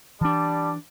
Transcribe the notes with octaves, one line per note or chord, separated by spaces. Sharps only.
E3 G3 D4 D5 A5